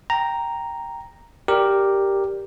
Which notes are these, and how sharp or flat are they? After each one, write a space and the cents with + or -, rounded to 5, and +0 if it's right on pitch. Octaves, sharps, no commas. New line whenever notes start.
G5 +0 A#5 +0
G4 +0 A#4 +0 D5 +0